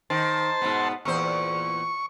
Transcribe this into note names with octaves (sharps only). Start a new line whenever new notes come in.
D#3 C5 A5
G#2 B2 B3
E2 A#2 C5 C#6